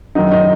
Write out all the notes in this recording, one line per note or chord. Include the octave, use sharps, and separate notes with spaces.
F#2 D#3 F#3 D#4
D#4